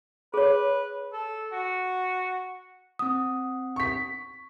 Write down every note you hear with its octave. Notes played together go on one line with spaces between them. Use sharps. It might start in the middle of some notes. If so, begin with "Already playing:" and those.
G#4 B4 C#5
A4
F#4
C4 F#5 D#6
C#6 B6